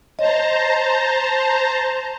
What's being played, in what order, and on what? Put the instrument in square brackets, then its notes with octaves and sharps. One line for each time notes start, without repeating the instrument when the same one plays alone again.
[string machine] C5 A5 A#5 [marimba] C#5 D#5